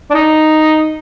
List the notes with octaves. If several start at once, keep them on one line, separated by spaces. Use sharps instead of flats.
D4
D#4